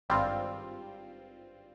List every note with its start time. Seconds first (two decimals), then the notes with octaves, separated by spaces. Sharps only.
0.09 G#1 G2 G3 C4 F4